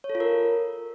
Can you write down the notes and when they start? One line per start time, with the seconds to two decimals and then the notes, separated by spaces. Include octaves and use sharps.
0.04 C#5
0.10 A4
0.15 F4
0.20 A#4